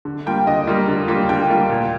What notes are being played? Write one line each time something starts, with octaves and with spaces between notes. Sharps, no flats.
D3
G3 A#3 F4 G5
D3 D#5
G3 A#3 F4
D3
G3 A#3 F4
D3 G5
G3 A#3 F4
A#2